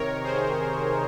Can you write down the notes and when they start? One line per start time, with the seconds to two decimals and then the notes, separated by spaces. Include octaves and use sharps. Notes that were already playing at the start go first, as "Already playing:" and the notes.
Already playing: C3 D#3 A#4 C#5
0.23 G#4 C5